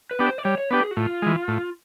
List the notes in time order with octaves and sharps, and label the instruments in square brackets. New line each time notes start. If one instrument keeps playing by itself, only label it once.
[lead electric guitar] B4
[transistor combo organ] B3 D4 G4
[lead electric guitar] C5
D5
[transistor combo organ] G3 [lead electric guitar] C#5
[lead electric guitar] C#5
[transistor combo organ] B3 D4 G4 [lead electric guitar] B4
[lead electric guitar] G#4
F#4
[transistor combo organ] A2 [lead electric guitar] F4
[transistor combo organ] E3 G#3
A2